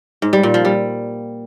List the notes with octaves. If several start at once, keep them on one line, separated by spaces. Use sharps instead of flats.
G#2
G3
A#2
F3
G3